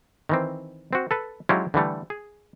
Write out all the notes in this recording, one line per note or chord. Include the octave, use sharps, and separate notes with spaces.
D#3 E3 C4
C4 F#4
A4 B4
F#3 G#3 C#4 E4 F4 G4
D3 E3 G3 A3
G#4